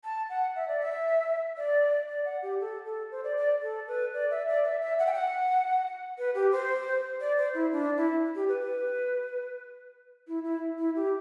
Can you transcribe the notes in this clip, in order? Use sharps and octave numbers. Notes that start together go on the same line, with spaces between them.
A5
F#5
E5
D5
E5
D5
D5
F#5
G4
A4
A4
C5
D5
D5
A4
B4
D5
E5
D5
E5
E5
F#5
G5
F#5
B4
G4
C5
D5
C5
E4
D4
E4
G4
B4
B4
E4
E4
E4
G4